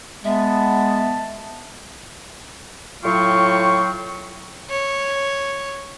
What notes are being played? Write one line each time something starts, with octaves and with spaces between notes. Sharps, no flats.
G#3 B3 E5 A5
A2 F#3 F4 F5 G5 C#6
C#5